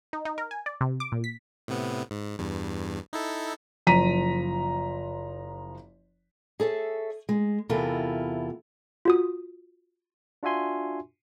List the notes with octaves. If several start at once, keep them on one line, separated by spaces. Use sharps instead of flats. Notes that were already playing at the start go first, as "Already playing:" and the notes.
D#4
D#4
A#4
G#5
D5
C3
D6
A#2
B6
A2 C3 B3
G#2
E2 G2
D#4 E4 A4
F#1 F3 A#5 B6 D#7
G#4 A4 C#5 E5
G#3
E2 C3 E4 F4 A4 A#4
F4 F#4 D#6
D4 F4 F#4 E5 G#5 C6